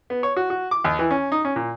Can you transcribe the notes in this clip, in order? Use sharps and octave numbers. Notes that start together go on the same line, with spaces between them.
B3
C#5
F#4
F#4
D6
D#2
E3
C#4
D#4
C#4
A#2